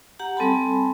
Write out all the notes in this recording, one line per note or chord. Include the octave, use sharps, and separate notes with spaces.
G4 F#5 A#5
G3 C4 A4 G#5 A5 B5